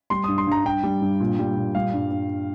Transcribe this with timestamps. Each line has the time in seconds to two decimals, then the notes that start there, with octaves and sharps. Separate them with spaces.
0.10 G3 C6
0.24 G2 D#6
0.38 C6
0.47 G2 A#5
0.65 G2 G5
0.84 G3
1.02 G2
1.20 A#2
1.39 G3
1.57 A#2
1.75 G3 F5
1.94 G2
2.11 G2